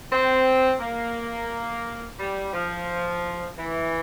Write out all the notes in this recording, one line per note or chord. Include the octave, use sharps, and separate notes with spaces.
C4
A#3
G3
F3
E3